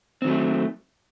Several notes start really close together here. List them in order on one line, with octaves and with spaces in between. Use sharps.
C4 D#3 F#3 A3